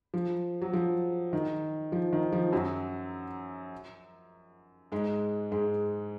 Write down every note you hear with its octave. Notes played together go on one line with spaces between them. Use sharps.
F3
F#3
F3
D#3
F3
D#3
F3
F#2 F#3
G#2 G#3
G#2 G#3